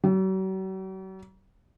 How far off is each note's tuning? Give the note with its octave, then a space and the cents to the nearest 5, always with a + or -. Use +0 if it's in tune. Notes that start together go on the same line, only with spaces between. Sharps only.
F#3 +45